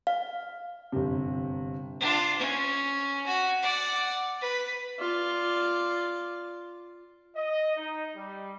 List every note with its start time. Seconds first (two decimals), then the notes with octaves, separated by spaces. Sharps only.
0.07 F5
0.92 G1 C3
2.00 D4 F4
2.39 C#4
3.26 F#4
3.62 D5 F#5
4.41 B4
4.99 F4 D5
7.36 D#5
7.77 D#4
8.16 G3